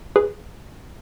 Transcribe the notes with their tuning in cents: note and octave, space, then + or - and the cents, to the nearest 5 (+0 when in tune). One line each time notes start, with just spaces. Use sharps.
G#4 +0 B4 +0